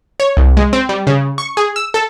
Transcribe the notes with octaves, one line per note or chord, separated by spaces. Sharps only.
C#5
C2
G#3
C4
G3
C#3
C#6
G#4
E6
A4